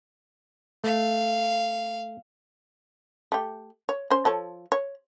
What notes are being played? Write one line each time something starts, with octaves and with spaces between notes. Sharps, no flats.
A3 F5
A3 G4
C#5
C#4 C5
F3 A4 C#5
C#5